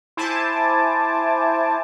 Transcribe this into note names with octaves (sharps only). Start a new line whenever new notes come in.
E4 C5 G#5 A5 D6